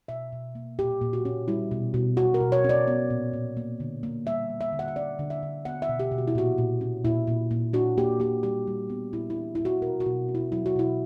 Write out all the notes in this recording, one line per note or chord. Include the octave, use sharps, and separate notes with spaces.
B2 E5
B2
A#3
A#2 G4
A#2
F#4
C#4
G3 E4
B2
B2
B2 F#4
A#4
B2
C#5
C#4 D5
B3
A#2
A#2
A#3
D3
A#3
G3 E5
G3
E5
D3
F#5
E5
C#4 D5
D3
E5
D3
B3 F#5
E5
B2
G4
B2
F#4
E4
A#2 F#4
A#2
C#4
A#2 E4
A#2
A#2
D4 F#4
A#3 G4
A#3 G4
G3 G4
G3
B3
A#2 E4
E4
D4
A#2 E4
F#4
B2 A#4
F#4
B2
C#4
E4
F#3 E4
F#4
B2 E4